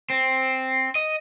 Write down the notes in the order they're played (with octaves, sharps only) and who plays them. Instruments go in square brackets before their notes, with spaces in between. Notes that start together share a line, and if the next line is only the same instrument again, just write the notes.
[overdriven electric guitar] C4
D#5